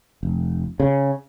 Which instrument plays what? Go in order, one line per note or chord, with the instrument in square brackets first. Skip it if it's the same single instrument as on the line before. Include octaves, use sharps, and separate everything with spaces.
[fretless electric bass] F1
C#3